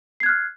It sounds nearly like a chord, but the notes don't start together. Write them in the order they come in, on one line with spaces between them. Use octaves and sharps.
C7 G#6 F#6 F6